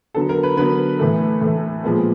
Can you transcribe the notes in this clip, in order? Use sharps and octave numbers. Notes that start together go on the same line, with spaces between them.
D3 F#3 B3 A4
A#4
B4
D3 F#3 B3 B4
A2 E3 A3
A2 E3 A3
A#2 F3 G#3 B3